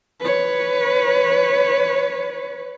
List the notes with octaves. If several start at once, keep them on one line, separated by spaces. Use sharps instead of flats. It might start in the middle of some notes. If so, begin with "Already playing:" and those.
B4 C#5